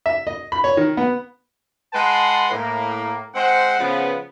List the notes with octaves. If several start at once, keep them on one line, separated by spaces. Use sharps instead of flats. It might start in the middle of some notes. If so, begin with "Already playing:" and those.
E5
D#5
B5
C#5
D#3
B3
G#3 B4 F#5 A5 C6
A2 A#3
G#3 C4 C5 F#5
C#3 F3 B3